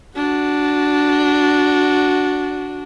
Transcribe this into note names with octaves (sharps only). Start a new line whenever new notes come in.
D4 F#4